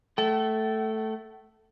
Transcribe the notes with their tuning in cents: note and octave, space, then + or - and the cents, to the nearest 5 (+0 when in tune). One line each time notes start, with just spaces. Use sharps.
A3 +0 A4 +0 G5 -45